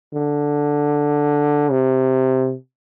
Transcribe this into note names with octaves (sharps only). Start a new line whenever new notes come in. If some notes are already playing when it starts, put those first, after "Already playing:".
D3
C3